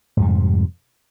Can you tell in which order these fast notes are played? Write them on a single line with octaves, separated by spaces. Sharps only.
G#2 F2 G3 C3